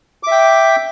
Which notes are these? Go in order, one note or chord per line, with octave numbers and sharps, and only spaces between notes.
E5 G5 D6